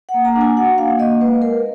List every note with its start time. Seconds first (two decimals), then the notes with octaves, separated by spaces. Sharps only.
0.09 F#5
0.14 A#3
0.25 A#5
0.36 D4
0.41 G#5
0.57 F#4 F#5
0.78 A#3 F5
0.99 A#3 D#5
1.21 G#3 B4
1.42 G#3 A#4